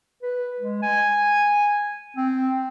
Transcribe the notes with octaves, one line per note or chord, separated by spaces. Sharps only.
B4
G#3
G#5
C4